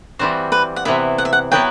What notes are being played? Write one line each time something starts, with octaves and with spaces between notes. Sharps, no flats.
E3 G3 C4 F#4 C5
B4
F#5
C3 E3 B3 E4 E5
F#5
E5
F#5
F#3 B3 E4 B4 G5